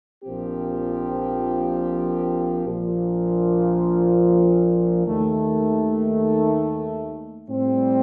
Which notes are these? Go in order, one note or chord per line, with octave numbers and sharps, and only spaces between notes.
A#1 A#2 F3 C4 G4
A#1 A#2 F3
D#2 D#3 A3
A2 G3 C4